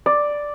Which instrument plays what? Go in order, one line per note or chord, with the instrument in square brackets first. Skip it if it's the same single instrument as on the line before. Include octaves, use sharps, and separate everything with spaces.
[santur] D5